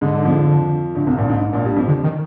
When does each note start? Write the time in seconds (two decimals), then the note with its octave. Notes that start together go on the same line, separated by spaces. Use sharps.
0.01 G#2 D3 G#3
0.25 F2 F3
0.95 D2 D3
1.07 C2 C3
1.18 A#1 A#2
1.29 G#2
1.41 G#2
1.53 A#1 A#2
1.65 G2 G3
1.76 F2 F3
1.88 D3
2.04 D#3